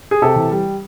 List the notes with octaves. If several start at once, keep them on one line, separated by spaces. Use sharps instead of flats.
G#4
C3 G4 A4
E3
G3